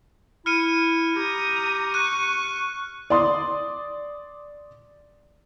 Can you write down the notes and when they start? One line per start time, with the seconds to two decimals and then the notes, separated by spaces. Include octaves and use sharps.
0.46 E4 F6 C#7 D#7
1.16 G4 A#5 D#6
1.94 C#6 F#6 D#7
3.10 D5 C6 D#6